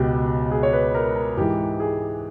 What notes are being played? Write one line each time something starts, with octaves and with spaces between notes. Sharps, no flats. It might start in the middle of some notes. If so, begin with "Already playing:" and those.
Already playing: C#2 B2 G4
G#4
C#5
B4
A#4
A#4
G#2 E3 G4
G#4